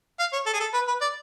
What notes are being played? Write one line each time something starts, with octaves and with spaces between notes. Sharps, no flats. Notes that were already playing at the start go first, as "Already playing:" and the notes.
F5
C#5
A4
G#4
A4
B4
B4
D5